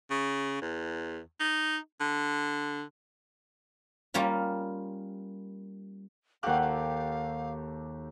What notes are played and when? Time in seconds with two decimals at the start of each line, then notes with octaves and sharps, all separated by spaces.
0.11 C#3
0.62 E2
1.40 D#4
2.00 D3
4.14 G3 A#3 C#4 F4
6.43 D#2 F#4 G4 A4 F5 F#6
6.61 F5